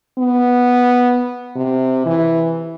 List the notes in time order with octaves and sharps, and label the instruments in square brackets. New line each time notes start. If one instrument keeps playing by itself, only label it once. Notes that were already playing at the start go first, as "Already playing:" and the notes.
[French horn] B3
C3
E3